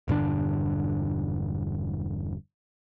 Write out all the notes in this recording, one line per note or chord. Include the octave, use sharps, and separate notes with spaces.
E1 G2 D3 D4